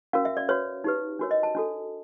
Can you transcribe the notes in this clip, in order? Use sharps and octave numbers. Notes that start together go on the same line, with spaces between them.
C#4 F#4 A#4 F5
E5
D5
F#4 B4 C#5
D#4 G4 B4
D4 F#4 A#4 C#5
D#5
A5
D4 F#4 A4